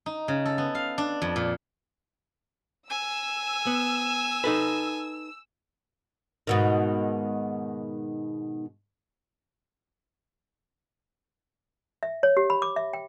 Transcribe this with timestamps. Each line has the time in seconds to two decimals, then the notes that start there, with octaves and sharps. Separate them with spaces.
0.06 D#4
0.28 C#3
0.46 A4
0.58 B3
0.75 F5
0.98 D4
1.22 F2
1.36 A#2
2.90 G#5 E6
3.67 B3
4.44 D#4 A4 B4
6.47 G#2 B2 D#3
12.03 E5
12.23 C#5
12.37 G4
12.50 B5
12.62 D6
12.76 E5
12.93 G5